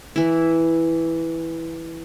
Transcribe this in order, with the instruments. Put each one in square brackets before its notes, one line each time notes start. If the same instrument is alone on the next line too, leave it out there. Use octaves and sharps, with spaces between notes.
[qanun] E3 E4